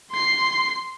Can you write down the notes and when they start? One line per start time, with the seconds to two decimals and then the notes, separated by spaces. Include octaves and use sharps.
0.11 C6 C7